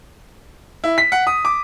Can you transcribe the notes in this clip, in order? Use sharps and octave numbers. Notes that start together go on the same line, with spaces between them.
E4
B6
F#5
D#6
D6